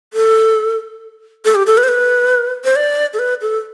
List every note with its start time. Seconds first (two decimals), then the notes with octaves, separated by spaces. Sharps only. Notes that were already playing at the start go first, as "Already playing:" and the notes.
0.13 A4
1.45 A4
1.55 G4
1.67 A4
1.78 B4
1.83 C5
1.88 B4
2.64 C5
2.76 D5
3.13 A4
3.19 B4
3.42 A4